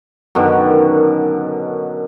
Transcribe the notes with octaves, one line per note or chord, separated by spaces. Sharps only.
F#2 B2 D3 D#3